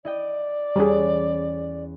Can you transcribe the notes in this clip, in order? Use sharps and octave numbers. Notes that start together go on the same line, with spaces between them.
E4 D5 D#5 G5
E2 G3 C#4 G#4 A4